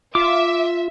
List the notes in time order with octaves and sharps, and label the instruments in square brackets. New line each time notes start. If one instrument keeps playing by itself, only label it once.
[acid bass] F4 [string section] E5 [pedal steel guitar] D6